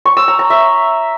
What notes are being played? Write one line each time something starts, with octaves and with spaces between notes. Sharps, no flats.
C#6
E6
A#5
A#5
E5